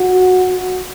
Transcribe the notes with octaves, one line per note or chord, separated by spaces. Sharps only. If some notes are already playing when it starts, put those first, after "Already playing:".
Already playing: F#4